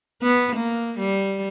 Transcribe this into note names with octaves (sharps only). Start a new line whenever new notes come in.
B3
A#3
G3